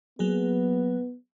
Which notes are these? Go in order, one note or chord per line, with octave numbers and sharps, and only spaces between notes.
F#3 A#3 B3 G#4